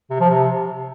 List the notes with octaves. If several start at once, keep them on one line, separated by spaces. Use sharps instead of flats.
C3
F3
C3